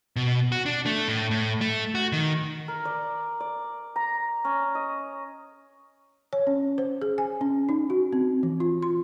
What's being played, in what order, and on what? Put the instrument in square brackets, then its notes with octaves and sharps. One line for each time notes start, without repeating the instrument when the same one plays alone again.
[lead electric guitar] B2
F#4
D4
A3
A2
A2
A3
F#4
D#3
[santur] A#4
D5
D5
A#5
C#4
D#5
[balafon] C#5
C#4
C5
G#4
G#5
C#4
D#4
F#4
C4
E3
F4
C6